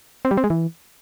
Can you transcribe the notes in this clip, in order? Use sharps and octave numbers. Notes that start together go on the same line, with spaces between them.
C4
G3
C4
G#3
E3